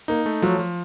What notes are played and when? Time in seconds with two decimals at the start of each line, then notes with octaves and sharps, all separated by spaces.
0.08 A#3 D#4
0.26 A3
0.42 F3 F#3
0.59 F3